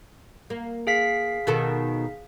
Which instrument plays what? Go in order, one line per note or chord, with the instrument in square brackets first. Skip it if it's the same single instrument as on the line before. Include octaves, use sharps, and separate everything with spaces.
[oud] A#3
[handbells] G#4 F5 B6
[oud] B2 D#3 A4